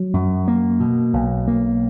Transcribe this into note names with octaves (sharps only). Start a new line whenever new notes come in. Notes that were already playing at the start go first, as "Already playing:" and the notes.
Already playing: F#3
F#2
A#3
B2
B1
A#3